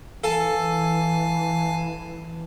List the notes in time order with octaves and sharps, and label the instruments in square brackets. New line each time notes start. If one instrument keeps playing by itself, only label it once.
[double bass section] E3 [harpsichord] A4 [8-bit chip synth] F5 G#5 A5